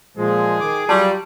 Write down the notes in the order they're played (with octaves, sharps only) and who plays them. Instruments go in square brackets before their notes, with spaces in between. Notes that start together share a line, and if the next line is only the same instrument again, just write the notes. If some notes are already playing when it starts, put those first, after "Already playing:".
[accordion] A#2 F3 G#3 [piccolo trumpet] G#4
[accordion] D#3 D6
[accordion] F#3 F4 [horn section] G3 [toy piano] A5 C6 C#6